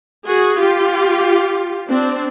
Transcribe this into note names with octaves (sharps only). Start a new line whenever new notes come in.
F#4 G#4
F4 G4
C4 D4